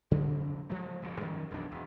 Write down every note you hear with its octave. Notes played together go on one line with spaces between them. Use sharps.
C#3 F3 F#3 C4
F3 G#3 A3
F#1 A#2 C#3 F3
F#2 D#3 F3 C#4
E1 B1 F2 D4
E1